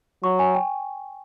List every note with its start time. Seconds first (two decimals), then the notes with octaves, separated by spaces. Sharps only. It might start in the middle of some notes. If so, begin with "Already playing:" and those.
0.24 F#3 C#6
0.39 G#5
0.55 G5